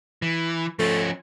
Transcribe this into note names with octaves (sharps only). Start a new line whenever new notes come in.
E3
F3 A3 C#4